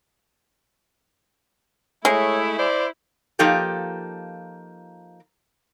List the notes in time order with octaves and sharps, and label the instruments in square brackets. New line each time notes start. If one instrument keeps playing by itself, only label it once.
[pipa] G#3 [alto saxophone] A3 [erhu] E4 [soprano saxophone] C#5
[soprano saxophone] C5 [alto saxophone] D5
[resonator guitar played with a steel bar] F3 A#3 D#4 G4 A4